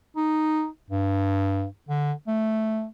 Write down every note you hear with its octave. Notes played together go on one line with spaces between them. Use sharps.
D#4
G2
D3
A3